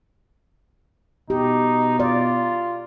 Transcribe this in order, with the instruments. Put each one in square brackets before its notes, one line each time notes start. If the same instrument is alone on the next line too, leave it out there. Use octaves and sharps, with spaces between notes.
[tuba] B2 [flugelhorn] D#4 [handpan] G4
[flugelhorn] F4 [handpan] D5